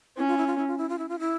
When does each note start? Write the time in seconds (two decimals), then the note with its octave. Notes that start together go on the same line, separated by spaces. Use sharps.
0.17 C#4 E4
0.27 F4
0.37 E4
0.47 F4
0.58 E4
0.67 F4
0.78 E4
0.89 F4
0.99 E4
1.09 F4
1.19 E4